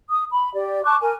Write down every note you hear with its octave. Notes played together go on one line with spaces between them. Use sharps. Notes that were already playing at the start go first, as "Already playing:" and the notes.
D#6
B5
G4 D5
A5 C#6 D6 F#6
A#4 G#5